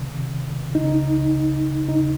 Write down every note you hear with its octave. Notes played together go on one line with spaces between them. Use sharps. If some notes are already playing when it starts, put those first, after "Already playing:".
Already playing: C2 C3 D#3
C#2 C#3 D#4
D#2 C#3 D#4